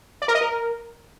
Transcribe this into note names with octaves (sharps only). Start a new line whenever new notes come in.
D5
A#4
D#5
A#4